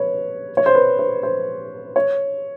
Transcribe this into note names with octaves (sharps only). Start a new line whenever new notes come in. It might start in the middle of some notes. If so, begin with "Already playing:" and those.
Already playing: B4 C#5
C#5
C5
B4
C5
C5
C#5